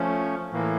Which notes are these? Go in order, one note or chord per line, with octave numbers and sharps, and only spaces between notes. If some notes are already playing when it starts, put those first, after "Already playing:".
Already playing: F3 A3 C#4
A2 E3 A#3